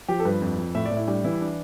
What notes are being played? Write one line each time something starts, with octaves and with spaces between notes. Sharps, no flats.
F3 G4
A4
G2 B4
F2
F2
A2 E5
D5
A2
E4
G3 D4
E3 E4
D4